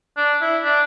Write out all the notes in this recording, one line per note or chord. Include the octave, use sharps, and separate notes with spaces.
D4
E4
D4